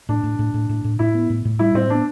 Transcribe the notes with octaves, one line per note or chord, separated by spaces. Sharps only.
A2 D4
A2
A2
A2
A2
A2
A2 E4
B3
A2
A2
G3 E4
A2 C4
B3 D4